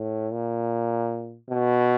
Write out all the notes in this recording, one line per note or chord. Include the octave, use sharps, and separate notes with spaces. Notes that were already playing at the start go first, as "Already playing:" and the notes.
Already playing: A2
A#2
B2